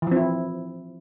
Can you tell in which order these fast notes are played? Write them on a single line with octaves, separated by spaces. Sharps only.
E3 F3 C4 E4